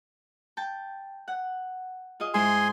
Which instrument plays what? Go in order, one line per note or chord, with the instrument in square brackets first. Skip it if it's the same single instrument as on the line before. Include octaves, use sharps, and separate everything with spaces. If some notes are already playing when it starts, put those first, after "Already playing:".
[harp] G5 A5
F#5
F4 G#4 D#5
[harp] G#2 G#3 E4 [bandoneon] G#4 G#5 C6